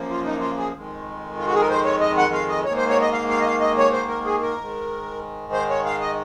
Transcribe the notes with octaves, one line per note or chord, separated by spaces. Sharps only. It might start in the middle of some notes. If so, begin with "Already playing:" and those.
Already playing: F#2 F3 A#3
F4
D#4
F4
G#4
F2 D#3 G#3
F4
F#4
G#4
A#4
C5
C#5
D#5
F#5
F5
D#5
G#2 D#3 A#3 C#5
C5
C#5
D#5
F5
F5
D#5
F5
D#5
C#5
C5
A#4
G#4
A#4
G#2 D#3 G#3
C5
C#5
F5
D#5